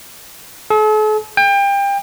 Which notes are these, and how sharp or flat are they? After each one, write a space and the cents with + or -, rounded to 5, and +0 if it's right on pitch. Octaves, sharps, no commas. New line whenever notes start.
A4 -45
G5 +30